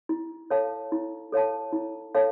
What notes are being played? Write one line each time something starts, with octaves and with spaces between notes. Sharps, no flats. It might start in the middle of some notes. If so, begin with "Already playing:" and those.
E4
A4 C#5 F5 A5
E4
A4 C#5 F5 A5
E4
A4 C#5 F5 A5